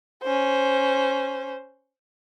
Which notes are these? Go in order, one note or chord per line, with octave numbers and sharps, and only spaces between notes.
C#4 C5